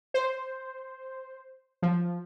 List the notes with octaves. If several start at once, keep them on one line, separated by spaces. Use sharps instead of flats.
C5
F3